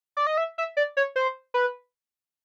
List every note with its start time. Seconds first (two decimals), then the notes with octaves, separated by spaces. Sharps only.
0.17 D5
0.27 D#5
0.37 E5
0.58 E5
0.77 D5
0.97 C#5
1.16 C5
1.54 B4